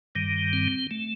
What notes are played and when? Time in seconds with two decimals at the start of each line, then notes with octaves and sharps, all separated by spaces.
0.15 G2 D#3 G3
0.53 C4
0.91 A3